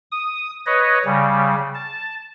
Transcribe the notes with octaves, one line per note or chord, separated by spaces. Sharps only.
D#6
B4 C#5 D#5
C#3 G3
A5